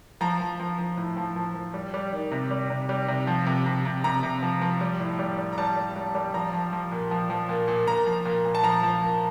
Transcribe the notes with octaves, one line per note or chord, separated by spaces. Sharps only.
F3 A#5
F3
F3
F3
A2
F3
F3
F3
G3
G3
D#3
C3
G3
C3
G3
C3
F3
C3
C3
C3
C3 A#5
C3
F3
F3
G3
A2
G3
G3
A#5
G3 A5
G3
G3
G3
F3 A#5
F3
F3
A#2
F3
F3
A#2
A#2
A#2 A#5
F3
A#2
A#2
A5
F3 A#5
F3
A#2